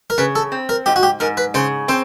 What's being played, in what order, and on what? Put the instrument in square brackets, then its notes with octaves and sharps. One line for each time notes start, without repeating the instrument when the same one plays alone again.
[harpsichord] A#4
[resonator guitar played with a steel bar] C#3 [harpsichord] B4
[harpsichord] A4
[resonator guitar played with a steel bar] C4
[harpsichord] A#4
[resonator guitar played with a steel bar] G#2 [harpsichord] G4
[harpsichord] F#4
G4
[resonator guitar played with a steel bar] G#2 [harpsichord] A#4
[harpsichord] B4
[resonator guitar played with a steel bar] C#3 [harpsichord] C5
[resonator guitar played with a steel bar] C4 [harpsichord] C5